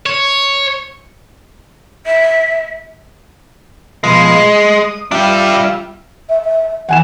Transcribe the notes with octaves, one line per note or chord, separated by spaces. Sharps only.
C#5
E5
B2 F3 G#3
D#6
G3 D4 F4 G4 E5
E5
E5
E3 F#5 G#5 E7